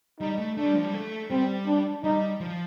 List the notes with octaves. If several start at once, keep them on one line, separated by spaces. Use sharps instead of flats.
G3 D#4
A3
A3 D4
G3
F3
G3
A3
G3 C4
D4
G3 D#4
F3